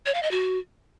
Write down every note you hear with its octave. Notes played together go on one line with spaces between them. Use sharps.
C#5
F5
D#5
F#4